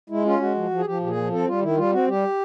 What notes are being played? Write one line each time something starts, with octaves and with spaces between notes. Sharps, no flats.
G#3 E4
C#4 F4
G#3 F#4
F3
F3
G#4
F3 G4
A#2 G4
G#4
F3
C4 A4
G3 F4
D#3 E4
G3 F4
C4 F#4
G3 G4